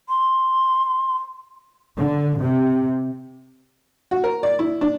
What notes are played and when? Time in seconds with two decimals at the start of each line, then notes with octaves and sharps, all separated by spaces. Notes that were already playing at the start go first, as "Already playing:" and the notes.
0.09 C6
1.98 D3
2.40 C3
4.11 F#4
4.24 A#4
4.43 D5
4.59 E4
4.81 D4